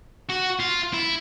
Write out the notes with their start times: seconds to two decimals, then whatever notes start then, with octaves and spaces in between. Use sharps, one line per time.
0.30 F#4
0.60 F4
0.94 E4